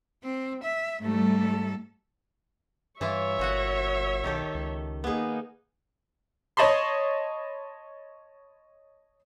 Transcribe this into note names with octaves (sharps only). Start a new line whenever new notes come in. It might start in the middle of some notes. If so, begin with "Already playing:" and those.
C4
E5
G#2 G3 A3 A4
G2 E3 E4 F4 C#5 E5
G1 A#2 F#4 F#5
B1 D#3 G4 A4
C#2
A#3 B3 D#4 G#4
C#5 D#5 A5 B5 C6